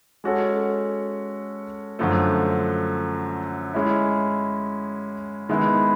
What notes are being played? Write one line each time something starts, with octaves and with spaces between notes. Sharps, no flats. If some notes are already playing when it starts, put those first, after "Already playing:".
G#3 C#4 F#4 A4 C#5
F#2 D3 F3 A3
G#3 C#4 E4
D#3 G#3 B3 E4